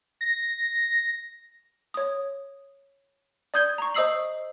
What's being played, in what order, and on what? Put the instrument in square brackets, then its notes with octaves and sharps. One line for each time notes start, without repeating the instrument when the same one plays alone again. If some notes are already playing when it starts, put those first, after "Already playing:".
[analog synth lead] A#6
[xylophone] C#5 D#6
D5 D#6 G6 G#6 G7
A#5 C#6
C5 D#5 D#6 E6 C7 F#7